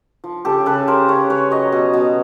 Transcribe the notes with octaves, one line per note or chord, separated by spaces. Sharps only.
F3
C#3 G4 A4
C#3 A4 B4
C#3 A#4 C5
C#3 B4 C#5
C#3 B4 C#5
F#3 C#5 D#5
B2
B2